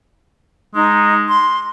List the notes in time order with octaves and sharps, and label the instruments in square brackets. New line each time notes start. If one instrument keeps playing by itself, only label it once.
[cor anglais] G#3 [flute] D#4
[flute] C6